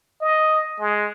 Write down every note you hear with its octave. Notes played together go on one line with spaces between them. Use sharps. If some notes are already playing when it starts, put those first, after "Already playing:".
D#5
G#3